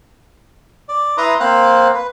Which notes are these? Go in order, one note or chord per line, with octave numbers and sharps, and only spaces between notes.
D5
E4 B4 A#5 C6 D#6
A#3 C4 C5 F5 F#6
B4